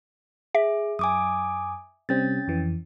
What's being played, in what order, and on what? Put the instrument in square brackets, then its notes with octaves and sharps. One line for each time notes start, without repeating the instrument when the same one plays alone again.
[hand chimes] G#4 [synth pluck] E5
[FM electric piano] F#2 [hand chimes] G#5 D6 D#6
[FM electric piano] C3 G3 C4 [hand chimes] C#4 A6
[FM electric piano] F2 E3